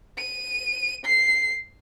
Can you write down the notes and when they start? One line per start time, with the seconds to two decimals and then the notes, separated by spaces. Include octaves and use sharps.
0.18 D#7
1.05 C7